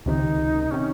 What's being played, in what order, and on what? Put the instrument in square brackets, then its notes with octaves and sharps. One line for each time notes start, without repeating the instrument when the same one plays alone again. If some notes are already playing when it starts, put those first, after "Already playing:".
[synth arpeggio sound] C#2 C3 D#3 [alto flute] D#4
[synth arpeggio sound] C3 D#3 [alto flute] C#4